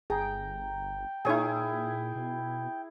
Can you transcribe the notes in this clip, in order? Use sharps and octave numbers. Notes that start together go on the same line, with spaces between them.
G1 G#4 G5 A#5
A#2 D#4 E4 G#4 C#5 G#5
B2